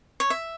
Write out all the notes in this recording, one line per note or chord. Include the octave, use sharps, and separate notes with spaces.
C#5
E5